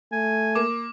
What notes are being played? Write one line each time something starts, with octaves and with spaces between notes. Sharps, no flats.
A3 G#5
A#3 D6